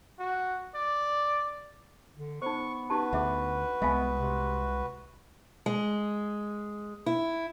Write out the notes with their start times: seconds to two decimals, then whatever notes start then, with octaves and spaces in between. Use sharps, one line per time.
0.19 F#4
0.75 D5
2.17 D3
2.42 B3 D#4 C5 C#6
2.90 D#4 F#4 G4 B4 A5
3.13 D2 G#4 E5 F#5
3.82 C2 G#3 B3 E5 F5 G#5
4.17 C3
5.66 G#3
7.06 E4